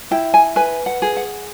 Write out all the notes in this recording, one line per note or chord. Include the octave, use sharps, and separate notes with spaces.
E4 G5
G#5
B4 G#5
F#5
G#4
F#5